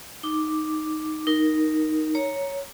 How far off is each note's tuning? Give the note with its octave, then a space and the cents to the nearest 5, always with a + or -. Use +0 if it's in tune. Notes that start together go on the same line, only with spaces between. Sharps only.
D#4 +0 D6 +0
D#4 +0 A#4 +0
C#5 +0 A#5 +5